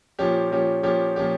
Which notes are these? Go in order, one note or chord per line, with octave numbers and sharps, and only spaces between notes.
A#2 F3 C#4 G4
A#2 F3 C#4 G4
A#2 F3 C#4 G4
A#2 F3 C#4 G4